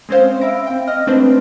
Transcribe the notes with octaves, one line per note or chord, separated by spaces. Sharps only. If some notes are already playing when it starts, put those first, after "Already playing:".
G#3 C4 C#4 C5 F5
E5 F5 B5 E6 A#6 D7
C4 G5
D#5 F6 A#6
G#3 A3 C4 D4 B4 C5